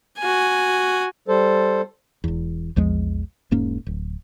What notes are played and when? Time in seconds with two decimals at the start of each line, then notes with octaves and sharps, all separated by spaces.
0.19 F#4 G#5
1.28 G3 A4 C5
2.24 E1 E2
2.76 A#1 E2 F3 G#3
3.51 E1 G#2 A#3 C#4
3.87 D1